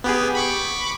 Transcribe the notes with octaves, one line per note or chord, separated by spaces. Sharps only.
B3 G4 G#4
B5 C#6 D6